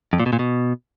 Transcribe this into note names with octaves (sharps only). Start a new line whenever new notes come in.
F2
A#2
B2
A#2
B2